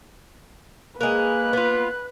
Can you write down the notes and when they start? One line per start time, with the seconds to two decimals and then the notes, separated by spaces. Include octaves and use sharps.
1.01 G#3 A#3 A#4 B4 F#6
1.53 B3 F4